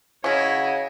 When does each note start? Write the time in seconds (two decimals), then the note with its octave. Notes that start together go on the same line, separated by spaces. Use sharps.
0.24 C#3 C#4 E4 F#4 C#5 D#5